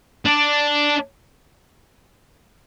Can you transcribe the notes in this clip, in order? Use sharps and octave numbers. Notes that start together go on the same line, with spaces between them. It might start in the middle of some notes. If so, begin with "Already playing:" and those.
D4